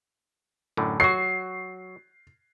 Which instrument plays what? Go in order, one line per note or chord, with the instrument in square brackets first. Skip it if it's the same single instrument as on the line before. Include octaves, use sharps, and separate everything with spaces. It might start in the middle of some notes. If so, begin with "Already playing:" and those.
[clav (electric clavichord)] F#2 A2 D3
[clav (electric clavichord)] F#3 F#4 [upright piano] C7